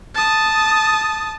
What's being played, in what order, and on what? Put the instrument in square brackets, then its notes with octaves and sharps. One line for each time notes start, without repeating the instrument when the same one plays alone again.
[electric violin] A5 D#6